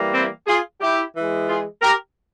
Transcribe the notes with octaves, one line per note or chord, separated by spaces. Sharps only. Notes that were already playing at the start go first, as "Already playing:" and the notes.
Already playing: E3 G3 A#3
C4 E4
F4 G#4
E4 G4
E3 G#3
F4 G#4
G4 A#4